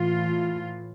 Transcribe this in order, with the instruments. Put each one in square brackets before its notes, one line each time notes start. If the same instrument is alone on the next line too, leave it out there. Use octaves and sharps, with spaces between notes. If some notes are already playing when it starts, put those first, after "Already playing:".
Already playing: [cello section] A2 E3 F4